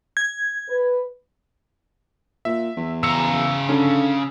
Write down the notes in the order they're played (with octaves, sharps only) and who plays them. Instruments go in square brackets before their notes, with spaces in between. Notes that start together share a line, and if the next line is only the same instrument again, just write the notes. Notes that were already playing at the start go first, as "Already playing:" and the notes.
[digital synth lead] G#6
[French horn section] B4
[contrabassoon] A#2 [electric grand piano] E5
[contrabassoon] E2
[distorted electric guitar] C#3 A#5 [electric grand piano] E6 C#7
[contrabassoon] D3 [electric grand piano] C#4